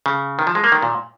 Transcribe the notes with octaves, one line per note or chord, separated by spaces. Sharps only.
C#3
D#3
F3
G#3
A#3
D#3
A#2